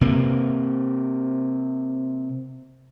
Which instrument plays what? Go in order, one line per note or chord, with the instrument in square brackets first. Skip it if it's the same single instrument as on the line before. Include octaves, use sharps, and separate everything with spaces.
[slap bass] C3 A#3